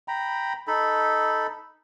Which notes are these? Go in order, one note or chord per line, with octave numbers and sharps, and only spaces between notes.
G5 A#5 B5
D#4 A4 B5